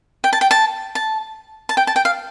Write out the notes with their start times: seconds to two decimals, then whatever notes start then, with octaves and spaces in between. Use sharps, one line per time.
0.24 G5
0.33 A5
0.41 G5
0.51 A5
0.95 A5
1.69 A5
1.77 G5
1.87 A5
1.96 G5
2.05 F5